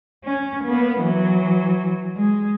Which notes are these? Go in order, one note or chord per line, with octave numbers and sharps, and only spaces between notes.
C#4
A#3 B3
E3 F#3
G#3